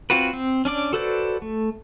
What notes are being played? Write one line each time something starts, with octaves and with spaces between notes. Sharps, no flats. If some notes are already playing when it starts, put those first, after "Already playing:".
C4 F4 F#4 B4
C4
C#4 D4 D5 D6
F#4 A4 B4 C5 D5
A3